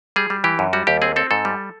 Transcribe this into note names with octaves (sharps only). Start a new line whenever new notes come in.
G3 G#4
G3
E3 G4
F#2
G3 F#4
D#2 G4
C4 G#4
C4 A4
G#2 A4
G3